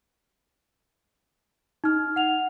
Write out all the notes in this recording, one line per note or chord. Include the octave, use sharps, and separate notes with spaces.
D#4 F6
F#5 F7